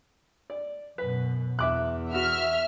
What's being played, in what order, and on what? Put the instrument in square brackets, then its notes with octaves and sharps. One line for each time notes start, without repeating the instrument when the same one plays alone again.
[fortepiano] D5
[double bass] F#2 B2 [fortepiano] B4
[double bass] E2 [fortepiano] E5 D6 F#6
[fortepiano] B3 F#4 [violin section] E5 F6